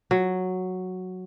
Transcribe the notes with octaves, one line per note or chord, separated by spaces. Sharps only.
F#3